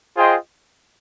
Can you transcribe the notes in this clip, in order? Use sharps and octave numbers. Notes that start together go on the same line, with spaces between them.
F4 G#4 C5 D#5 G5